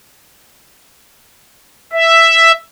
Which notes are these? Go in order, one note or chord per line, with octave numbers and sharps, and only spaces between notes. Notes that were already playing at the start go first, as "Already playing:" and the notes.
E5